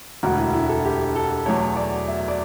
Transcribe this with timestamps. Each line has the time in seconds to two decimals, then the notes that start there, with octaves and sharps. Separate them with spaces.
0.23 E1 D2 D3 F#4
0.38 E4
0.53 E4
0.69 A4
0.85 G4
1.15 A4
1.46 E2 B2 F#3 A3 C#5
1.77 D5
2.08 E5
2.28 D5